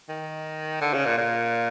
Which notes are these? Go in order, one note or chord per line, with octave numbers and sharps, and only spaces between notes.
D#3
D3
C#3
A#2
A#2